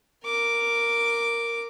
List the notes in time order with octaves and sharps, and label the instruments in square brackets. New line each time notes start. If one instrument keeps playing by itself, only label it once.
[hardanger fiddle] A#4 D6